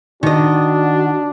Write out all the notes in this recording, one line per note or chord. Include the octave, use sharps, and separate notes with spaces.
D#3 D4 F#4 D#5